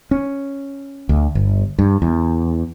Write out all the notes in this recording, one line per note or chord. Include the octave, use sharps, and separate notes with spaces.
C#4
D2
G1
G2
E2